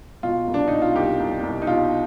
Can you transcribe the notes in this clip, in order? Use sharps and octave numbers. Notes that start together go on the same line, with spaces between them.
B2 F4
C2
D4
B2 D#4
F4
C2 G4
C2
C2
D#4
B2 F4